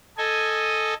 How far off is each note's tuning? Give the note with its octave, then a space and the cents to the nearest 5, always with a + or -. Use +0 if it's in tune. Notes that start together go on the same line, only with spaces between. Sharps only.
A4 +0 D#5 +0 G#5 +0